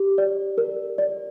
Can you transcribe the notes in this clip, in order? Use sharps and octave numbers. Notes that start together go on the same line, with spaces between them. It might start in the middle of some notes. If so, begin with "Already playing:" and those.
Already playing: G4
D5
A#4
D5